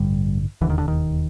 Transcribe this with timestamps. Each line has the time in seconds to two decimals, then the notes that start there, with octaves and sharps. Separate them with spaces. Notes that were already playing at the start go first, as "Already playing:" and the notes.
Already playing: A1 G2 D3 G3
0.61 E1 D#2 D3 E3
0.70 D#3
0.78 D3
0.88 D#3